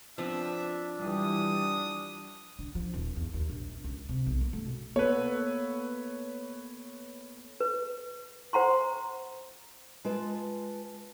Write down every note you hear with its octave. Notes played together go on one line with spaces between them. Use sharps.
F3 B3 C4 D4 E5
E3 G3 D#6
D3
F3
D#1
E2
D#2
A#1
C#2
C3
B1
A#3
A3
B2
A#3 B3 A4 B4 C#5
B4
C5 F#5 A#5 C6
G#3 F4 B4 A5